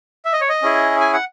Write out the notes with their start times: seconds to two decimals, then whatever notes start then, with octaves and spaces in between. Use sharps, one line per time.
0.25 E5
0.33 D#5
0.41 C#5
0.49 D#5
0.62 C#4 E4 G#4
1.00 G#5
1.13 F#5